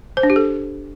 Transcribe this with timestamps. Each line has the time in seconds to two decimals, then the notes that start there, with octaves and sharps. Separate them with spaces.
0.17 C5
0.23 D4
0.30 G4
0.36 A4